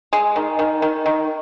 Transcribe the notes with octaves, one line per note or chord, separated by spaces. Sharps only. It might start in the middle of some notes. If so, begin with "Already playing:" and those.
G#3
D#3
D#3
D#3
D#3